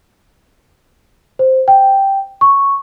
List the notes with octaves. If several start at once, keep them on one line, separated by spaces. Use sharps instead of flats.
C5
G5
C#6